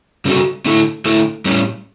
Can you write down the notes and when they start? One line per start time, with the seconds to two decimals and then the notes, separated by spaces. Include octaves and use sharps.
0.25 C#3 G3 C#4 F#4 A4
0.66 D3 A3 E4 A4
1.05 D3 A3 E4 A4
1.45 A2 G3 C#4